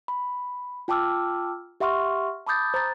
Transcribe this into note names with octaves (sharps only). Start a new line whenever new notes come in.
B5
F4 G5 A5 D6 E6 F6
G4 E5 F#5 C6 C#6 F6
A5 B5 D6 D#6 G6 A6
C5 A#5 A6